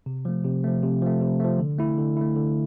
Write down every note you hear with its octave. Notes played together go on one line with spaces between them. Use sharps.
C3
F3 A3
C3
F3 A3
C3
F3 A3
C3
F3 A3
D3
A3 E4
D3
A3 E4
D3